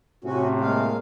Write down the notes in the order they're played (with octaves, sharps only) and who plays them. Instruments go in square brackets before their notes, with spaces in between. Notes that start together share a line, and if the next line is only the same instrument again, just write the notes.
[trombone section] A2 C3 [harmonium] C#4 F#4
[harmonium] G#3 A#3 F5